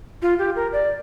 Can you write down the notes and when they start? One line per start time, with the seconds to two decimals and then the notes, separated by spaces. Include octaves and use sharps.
0.22 F4
0.38 G4
0.56 A#4
0.72 D5